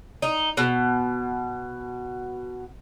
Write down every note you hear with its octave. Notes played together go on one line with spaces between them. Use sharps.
D#4
B2